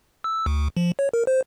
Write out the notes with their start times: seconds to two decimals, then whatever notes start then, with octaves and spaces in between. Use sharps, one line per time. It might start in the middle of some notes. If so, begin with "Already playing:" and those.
0.24 E6
0.46 D2
0.77 F3
0.99 C#5
1.14 A#4
1.27 C5